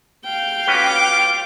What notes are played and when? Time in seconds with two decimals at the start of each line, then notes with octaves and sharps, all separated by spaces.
0.24 F5 G5
0.67 C#4 F4 F#4 B4 D6